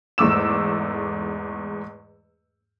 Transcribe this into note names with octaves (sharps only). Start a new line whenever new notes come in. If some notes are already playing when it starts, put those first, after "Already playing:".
E2 G#2 A3 D6 E6 E7